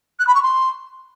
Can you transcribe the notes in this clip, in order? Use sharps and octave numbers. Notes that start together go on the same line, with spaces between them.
F#6
B5
C#6
C6